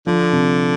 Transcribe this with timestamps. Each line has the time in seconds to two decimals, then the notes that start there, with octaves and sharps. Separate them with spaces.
0.07 D3 F3
0.32 C3